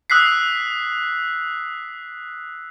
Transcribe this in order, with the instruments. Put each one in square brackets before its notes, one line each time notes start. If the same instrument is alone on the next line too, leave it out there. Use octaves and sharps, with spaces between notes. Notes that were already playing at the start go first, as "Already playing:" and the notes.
[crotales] D#6 E6 F#6 B6 C7